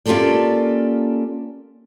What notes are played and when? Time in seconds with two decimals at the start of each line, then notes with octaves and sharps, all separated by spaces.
0.06 A#3 C#4 F4 G4 A4 D5